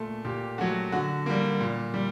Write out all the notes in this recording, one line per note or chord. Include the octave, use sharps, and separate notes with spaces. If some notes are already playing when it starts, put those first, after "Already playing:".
Already playing: A#2 A3
A#2 G4
F#3 A3 F#4
D3 F#4
G3 A#3
A#2
G3